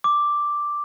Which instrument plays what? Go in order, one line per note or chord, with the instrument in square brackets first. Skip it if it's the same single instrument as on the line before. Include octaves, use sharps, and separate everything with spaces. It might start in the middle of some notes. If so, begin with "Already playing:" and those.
[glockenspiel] D6